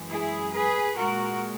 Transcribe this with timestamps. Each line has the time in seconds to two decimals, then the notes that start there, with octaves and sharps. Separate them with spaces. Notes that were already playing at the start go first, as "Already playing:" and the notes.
Already playing: F#2 E3 G#3
0.09 E4 G#4
0.53 G#4 B4
0.96 A#2 G#3 F#4 A#4